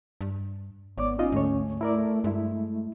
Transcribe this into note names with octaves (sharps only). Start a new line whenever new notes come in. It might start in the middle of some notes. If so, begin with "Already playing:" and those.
G2
G#1 B3 C#5 D5 D6
C#4 D#4 F4 D#5
D2 G#2 A3 C#5
A3 E4 A#4 D5
G2 G#3 A3 E4